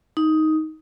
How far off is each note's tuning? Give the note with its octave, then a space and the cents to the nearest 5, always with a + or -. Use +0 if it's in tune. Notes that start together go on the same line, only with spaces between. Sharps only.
D#4 +10